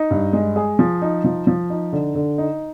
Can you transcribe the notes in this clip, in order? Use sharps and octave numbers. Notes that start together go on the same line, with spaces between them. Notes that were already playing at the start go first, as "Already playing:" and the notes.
Already playing: D#4
G2
G#3
G#4
F3
D#4
F3
F3
D#4
D3
D3
D#4